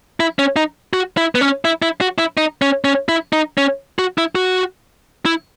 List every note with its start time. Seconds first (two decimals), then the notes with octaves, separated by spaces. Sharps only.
0.20 E4
0.39 C#4
0.56 D#4
0.93 F#4
1.17 E4
1.35 B3
1.41 C#4
1.65 E4
1.82 E4
2.01 F#4
2.18 E4
2.37 D#4
2.62 C#4
2.84 C#4
3.09 E4
3.33 D#4
3.58 C#4
3.99 F#4
4.18 E4
4.35 F#4
5.25 E4